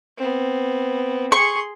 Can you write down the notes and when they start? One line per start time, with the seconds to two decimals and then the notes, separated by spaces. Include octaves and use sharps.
0.17 B3 C4
1.32 G#4 C6 C#6